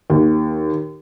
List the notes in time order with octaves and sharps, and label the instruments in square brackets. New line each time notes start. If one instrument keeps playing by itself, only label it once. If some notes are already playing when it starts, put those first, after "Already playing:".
[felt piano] D#2